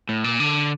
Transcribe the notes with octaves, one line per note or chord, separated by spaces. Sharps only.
A2
A#2
D3